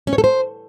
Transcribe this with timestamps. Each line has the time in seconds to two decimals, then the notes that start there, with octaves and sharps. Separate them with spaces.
0.07 C#4
0.13 C#5
0.18 A4
0.24 C5